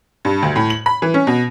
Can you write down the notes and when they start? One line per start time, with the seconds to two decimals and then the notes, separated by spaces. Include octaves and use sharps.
0.25 G2
0.42 D2
0.56 A2
0.70 F#7
0.86 B5
1.02 E3
1.14 C#4
1.27 B2